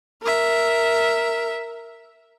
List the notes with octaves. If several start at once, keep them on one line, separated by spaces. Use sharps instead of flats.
A#4 E5